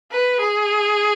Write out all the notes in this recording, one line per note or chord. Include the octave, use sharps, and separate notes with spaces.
B4
G#4